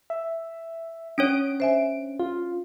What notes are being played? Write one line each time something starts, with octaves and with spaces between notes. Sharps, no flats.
E5
C#4 D4 C#5 D7
C5 E5 G#5
F4